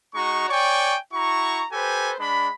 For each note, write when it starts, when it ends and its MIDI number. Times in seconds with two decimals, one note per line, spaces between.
0.15 0.48 56
0.15 0.48 63
0.15 0.48 66
0.15 0.48 82
0.15 0.48 85
0.49 0.96 73
0.49 0.96 74
0.49 0.96 79
0.49 0.96 80
0.49 0.96 85
1.13 1.64 64
1.13 1.64 66
1.13 1.64 82
1.13 1.64 85
1.72 2.13 67
1.72 2.13 69
1.72 2.13 71
1.72 2.13 72
1.72 2.13 80
2.19 2.50 56
2.19 2.50 62
2.19 2.50 83